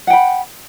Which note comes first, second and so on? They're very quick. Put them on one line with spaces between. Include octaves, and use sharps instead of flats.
F#5 G5 B5